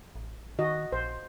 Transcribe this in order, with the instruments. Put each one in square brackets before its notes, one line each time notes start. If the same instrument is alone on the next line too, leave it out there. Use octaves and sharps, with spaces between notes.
[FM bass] A1
[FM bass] D#3 [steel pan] F#4 D#5
[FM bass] A#1 [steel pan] C5